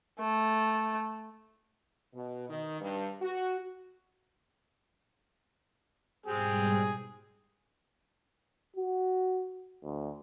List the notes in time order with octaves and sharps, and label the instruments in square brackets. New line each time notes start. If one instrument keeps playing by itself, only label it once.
[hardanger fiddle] A3
[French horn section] B2
D#3
G2
F#4
[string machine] G#2 B2 G3 [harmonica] G#3 C4 G4 [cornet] G#4
[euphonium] F#4
D2